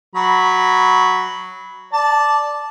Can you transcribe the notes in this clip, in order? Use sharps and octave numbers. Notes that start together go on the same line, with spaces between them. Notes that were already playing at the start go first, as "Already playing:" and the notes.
F#3 B5
D5 A5